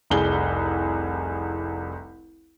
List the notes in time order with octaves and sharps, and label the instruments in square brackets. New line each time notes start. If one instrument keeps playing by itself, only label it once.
[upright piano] F1 C2 G#4 G7